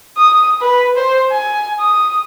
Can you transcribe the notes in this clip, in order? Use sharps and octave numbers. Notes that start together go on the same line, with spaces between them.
D#6
B4
C5
G#5
D#6